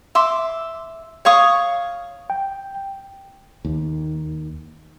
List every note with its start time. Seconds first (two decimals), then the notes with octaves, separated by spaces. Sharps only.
0.15 E5 C6 D6
1.25 C#5 F5 C#6 D#6
2.30 G5
3.65 D#2